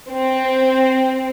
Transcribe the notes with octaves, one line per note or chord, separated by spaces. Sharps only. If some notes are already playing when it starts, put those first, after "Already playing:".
C4